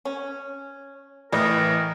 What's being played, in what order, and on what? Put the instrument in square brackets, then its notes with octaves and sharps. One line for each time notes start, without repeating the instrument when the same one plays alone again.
[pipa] C#4
[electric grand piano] A2 E3 [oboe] A#4 [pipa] B4 D#5